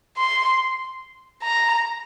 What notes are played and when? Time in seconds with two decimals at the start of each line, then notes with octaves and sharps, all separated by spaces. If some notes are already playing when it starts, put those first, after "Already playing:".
0.17 C6
1.43 A#5